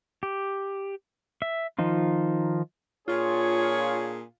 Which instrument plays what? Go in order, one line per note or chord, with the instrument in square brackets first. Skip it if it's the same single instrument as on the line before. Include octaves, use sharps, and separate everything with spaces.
[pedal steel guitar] G4
E5
D#3 F3 D#4 F4
[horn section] A#2 D4 G#4 [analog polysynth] F4 [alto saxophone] C#5